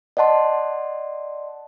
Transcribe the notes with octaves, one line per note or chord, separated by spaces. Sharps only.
D5 D#5 F#5 A5 C6